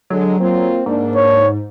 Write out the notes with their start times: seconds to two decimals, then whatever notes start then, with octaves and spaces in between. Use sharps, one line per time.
0.10 D3 F#3 G#3
0.39 A#3 C4 F4
0.86 G#2 A#3 D4
1.16 C#5